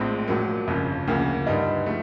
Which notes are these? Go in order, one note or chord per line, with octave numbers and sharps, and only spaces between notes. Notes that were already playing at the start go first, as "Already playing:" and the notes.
Already playing: A#1 A2 F3 G#3 C4
A#1 A2 F#3 A#3
G1 F2 C#3
D2 C#3 F3 A#3
G2 D3 G3 B3 D#4
F3 A3